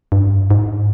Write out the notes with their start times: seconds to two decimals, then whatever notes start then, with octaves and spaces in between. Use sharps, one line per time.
0.12 G2
0.50 G#2